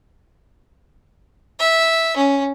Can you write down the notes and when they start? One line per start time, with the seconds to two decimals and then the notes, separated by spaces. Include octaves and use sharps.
1.59 E5
2.16 C#4